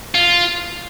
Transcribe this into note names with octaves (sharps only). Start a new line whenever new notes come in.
F4